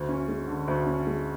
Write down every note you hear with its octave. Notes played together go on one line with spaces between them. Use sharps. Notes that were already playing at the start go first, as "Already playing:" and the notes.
Already playing: D2
C#4
G#3
D3
D2
C#4
G#3